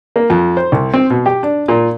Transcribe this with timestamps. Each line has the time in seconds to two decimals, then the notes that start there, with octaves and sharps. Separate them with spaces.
0.16 A#3
0.30 F2
0.57 C5
0.72 C2
0.94 C4
1.10 B2
1.26 G4
1.43 D4
1.68 A#2